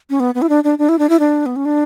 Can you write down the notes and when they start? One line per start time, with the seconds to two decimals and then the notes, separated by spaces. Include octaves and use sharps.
0.10 C#4
0.20 B3
0.35 B3
0.42 E4
0.49 D4
0.64 D4
0.78 D4
0.89 E4
0.99 D4
1.09 E4
1.19 D4
1.46 B3
1.56 C#4
1.65 D4